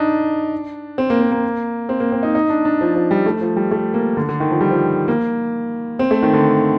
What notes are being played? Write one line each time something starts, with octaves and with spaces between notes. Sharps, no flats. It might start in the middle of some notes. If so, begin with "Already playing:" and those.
Already playing: D4 D#4
C4
A#3
C4
A#3
C4
A#3
C4
D#4
D#4
D4
D4
F3
F3
G3
A3
F3
G3
A3
A#3
D3
D3
D#3
F3
G3
F3
A#3
C4
A3
D#3
D3